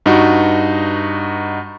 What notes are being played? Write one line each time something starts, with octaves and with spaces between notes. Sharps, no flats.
G2 D#4 F#4